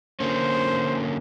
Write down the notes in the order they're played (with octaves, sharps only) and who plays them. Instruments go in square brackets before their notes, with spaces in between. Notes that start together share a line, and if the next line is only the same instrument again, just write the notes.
[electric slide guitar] D3 A#3 C#4 [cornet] C5